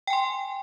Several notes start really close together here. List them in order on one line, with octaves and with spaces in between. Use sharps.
G5 G#5 C6